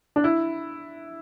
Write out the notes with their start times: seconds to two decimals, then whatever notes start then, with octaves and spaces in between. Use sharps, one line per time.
0.16 D4
0.24 E4